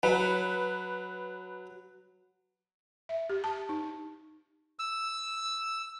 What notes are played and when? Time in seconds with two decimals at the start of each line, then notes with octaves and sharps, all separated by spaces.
0.03 F#3 B4
3.09 E5
3.30 G4
3.44 A5
3.69 D#4
4.79 E6